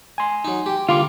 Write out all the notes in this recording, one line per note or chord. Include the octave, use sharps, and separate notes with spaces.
G#5 C6
F#3 D#4
G4 G5
D3 G3 A#3 F4 C6 D6